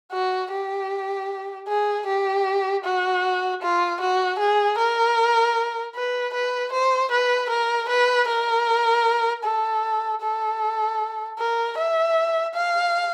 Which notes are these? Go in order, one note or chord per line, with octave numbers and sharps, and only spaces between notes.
F#4
G4
G#4
G4
F#4
F4
F#4
G#4
A#4
B4
B4
C5
B4
A#4
B4
A#4
A4
A4
A#4
E5
F5